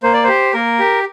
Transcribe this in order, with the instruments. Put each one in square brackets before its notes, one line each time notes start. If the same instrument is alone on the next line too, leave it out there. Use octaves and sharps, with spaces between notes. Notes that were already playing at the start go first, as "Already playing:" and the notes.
[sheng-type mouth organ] A#3 C5
D5
G4 C5
A#3 A#4
G4